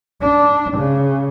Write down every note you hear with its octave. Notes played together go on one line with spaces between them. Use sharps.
D4
C#3